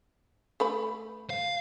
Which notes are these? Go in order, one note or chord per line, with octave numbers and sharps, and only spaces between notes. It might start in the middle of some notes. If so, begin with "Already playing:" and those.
A3 B4 B5
F5